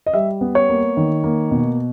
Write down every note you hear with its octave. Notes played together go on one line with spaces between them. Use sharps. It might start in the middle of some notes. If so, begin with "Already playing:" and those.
D#5
G3 E5
B3
C#5
A#3
D#3
A#3
B2